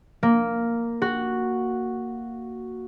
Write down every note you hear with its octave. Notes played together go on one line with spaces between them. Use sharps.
A#3
F#4